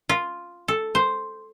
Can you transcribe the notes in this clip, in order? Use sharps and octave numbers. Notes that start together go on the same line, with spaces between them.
F4
A4
C5